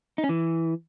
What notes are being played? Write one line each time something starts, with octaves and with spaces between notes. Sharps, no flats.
D#4
C#4
E3